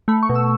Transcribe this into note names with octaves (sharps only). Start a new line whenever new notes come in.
A3 B5
C#6
B2
E6